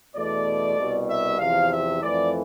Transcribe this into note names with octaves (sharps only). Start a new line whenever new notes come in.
E2 B2 A3 D5
C2 B2 G3
E5
E2 C3 F3 F5
E5
F2 E3 A3 D5